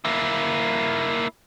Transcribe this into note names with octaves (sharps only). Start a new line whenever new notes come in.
A#3 E4